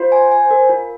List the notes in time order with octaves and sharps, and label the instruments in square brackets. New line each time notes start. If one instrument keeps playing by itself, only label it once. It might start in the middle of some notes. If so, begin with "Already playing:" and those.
Already playing: [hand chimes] F4 [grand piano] C5
[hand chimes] G#5
G#5
A#4
F4